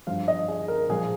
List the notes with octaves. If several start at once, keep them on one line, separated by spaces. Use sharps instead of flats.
G2 F3 F5
D#5
G#4
A#4
A#2 F3 G#4